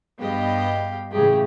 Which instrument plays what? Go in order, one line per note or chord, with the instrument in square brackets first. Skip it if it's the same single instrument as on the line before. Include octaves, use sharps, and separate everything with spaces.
[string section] G2 B3 D#5 [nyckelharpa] G4 F5
[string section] A2 C#3 E3 [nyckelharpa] G4 G#4